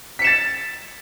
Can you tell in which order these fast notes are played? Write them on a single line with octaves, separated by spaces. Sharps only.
B6 C#7 E7 A6